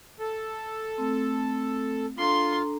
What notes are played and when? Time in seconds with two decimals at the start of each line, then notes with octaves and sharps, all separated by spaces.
0.20 A4
0.98 A3 C4
2.18 D4 F4 A4 A#5 C6